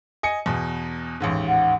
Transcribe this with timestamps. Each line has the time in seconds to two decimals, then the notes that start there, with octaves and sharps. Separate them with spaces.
0.23 D#5 G#5 C#7
0.46 E2 B2
1.20 A1 D#2 G#2
1.48 F#5